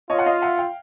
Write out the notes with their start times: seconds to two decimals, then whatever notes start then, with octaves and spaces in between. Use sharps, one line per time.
0.10 F4 C#5 D#5
0.18 F#5
0.26 D#5 F5
0.42 E5 F#5
0.58 F5 G5